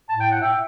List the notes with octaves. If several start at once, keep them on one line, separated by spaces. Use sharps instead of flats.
A2 A5
G5
F#5
E5 G5